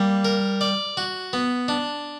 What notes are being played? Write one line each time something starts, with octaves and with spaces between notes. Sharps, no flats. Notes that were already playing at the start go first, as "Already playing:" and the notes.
Already playing: G3 A#3
A#4
D5
F#4
B3
D4